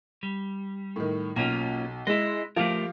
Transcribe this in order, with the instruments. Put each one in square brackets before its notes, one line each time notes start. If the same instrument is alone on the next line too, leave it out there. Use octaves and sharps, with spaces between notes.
[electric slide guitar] G3
[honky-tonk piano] A2 D#3
[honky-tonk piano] B1 [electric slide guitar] A#3 C#4 F4
[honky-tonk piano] G#3 [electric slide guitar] E4 D#5
[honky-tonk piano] F3 F4 [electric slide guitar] A3 G4 A#4